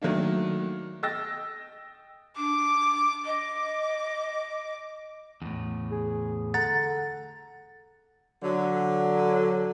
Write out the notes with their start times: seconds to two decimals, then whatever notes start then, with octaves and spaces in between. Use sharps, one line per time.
0.02 D#3 F#3 A3 A#3 D4
1.03 D#5 G5 E6 A6 A#6
2.37 D4 D6
3.26 D#5 D6
5.42 E2 A2
5.91 G#4
6.54 D3 F#5 A#5 A6
8.42 D3 F#3